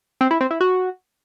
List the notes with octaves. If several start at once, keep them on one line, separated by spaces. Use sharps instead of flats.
C4
E4
C4
E4
F#4